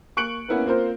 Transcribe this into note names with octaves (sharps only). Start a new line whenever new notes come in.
A#3 C#6 F#6 C#7 D7 F#7
A#3 B3 C#4 E4 A#4 B4
A#3 C4 F4 A#4 C5